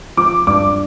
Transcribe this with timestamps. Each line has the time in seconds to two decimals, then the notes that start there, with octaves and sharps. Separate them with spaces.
0.17 F3 D6
0.47 G2 D6